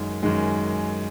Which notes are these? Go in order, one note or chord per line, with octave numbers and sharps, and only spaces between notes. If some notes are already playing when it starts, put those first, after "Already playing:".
Already playing: F#2 D#3 G#3
F#2 D#3 G#3